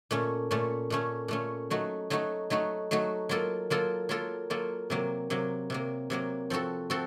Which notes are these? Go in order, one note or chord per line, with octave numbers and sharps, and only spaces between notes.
A#2 A3 C#4
A#2 A3 C#4
A#2 A3 C#4
A#2 A3 C#4
F#3 A3 D#4 F#4
F#3 A3 D#4 F#4
F#3 A3 D#4 F#4
F#3 A3 D#4 F#4
F#3 A#3 F4 A4
F#3 A#3 F4 A4
F#3 A#3 F4 A4
F#3 A#3 F4 A4
C3 F#3 A#3
C3 F#3 A#3
C3 F#3 A#3
C3 F#3 A#3
F3 C4 F#4 A4
F3 C4 F#4 A4